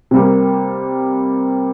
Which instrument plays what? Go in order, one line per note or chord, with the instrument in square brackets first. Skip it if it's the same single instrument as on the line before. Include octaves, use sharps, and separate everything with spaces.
[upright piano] C3 G3 A#3